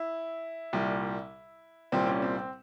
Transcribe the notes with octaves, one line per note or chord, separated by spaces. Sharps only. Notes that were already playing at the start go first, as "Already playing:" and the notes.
Already playing: E4
C2 A#2 G3
C2 A#2 G3 C4
C#4
C4
C4